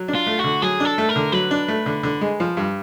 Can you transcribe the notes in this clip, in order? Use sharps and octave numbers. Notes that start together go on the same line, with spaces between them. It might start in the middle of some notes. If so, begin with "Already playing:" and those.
Already playing: F#3
D4
F4
A3
F#4
D3
F#3 G#4
D4 A4
A3
A#4
D3
F#3 B4
D4
A3
D3
D3
G#3
F3
G2